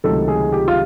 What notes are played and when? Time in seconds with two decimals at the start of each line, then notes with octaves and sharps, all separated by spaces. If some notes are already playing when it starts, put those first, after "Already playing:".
0.04 C#2 C3 D#3 F#3 A3 A4
0.28 G#4
0.52 G4
0.68 F4